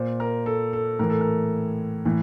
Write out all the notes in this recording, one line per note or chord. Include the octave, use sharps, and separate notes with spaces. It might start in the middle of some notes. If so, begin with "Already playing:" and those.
Already playing: A#2 C5
A#4
A4
A4
A2 E3 A#4
A4
A#4
A2 E3